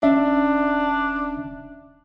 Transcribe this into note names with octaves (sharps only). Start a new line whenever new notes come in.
D#1 C#4 D4 E5